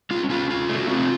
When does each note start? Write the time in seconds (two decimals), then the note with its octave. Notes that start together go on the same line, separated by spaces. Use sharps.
0.11 C#4 F4
0.30 C#4 F4
0.50 F4
0.69 A3
0.76 F#4
0.88 C4 F4